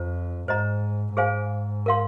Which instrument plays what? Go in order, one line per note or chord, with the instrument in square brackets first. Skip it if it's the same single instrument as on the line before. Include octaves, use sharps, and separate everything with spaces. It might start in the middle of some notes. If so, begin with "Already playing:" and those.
Already playing: [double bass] F2 [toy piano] F4 C5
[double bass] G#2 [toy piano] C5 D#5 A#5
[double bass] G#2 [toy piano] G#4 C5 F5 G#5
[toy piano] A#4 F5 C6